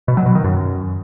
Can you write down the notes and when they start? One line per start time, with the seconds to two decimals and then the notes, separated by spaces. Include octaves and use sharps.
0.08 B2
0.17 F#3
0.26 B2
0.35 D#3
0.44 F#2